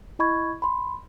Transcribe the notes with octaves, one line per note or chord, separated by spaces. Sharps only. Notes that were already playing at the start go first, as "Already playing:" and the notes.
E4 D#5 B5 C#6 G#6
B5 C6